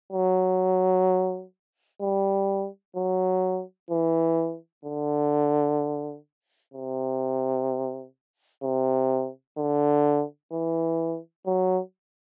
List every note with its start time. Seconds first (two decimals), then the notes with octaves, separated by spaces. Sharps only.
0.12 F#3
2.01 G3
2.96 F#3
3.90 E3
4.85 D3
6.74 C3
8.63 C3
9.58 D3
10.52 E3
11.46 F#3